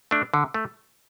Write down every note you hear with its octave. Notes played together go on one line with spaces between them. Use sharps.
A3 D4
D3
A3